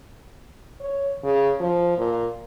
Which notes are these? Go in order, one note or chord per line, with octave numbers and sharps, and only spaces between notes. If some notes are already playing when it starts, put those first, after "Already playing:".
C#5
C#3
F3
A#2